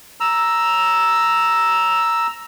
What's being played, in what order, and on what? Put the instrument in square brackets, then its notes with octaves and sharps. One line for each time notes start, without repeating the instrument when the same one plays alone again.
[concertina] A#5 E6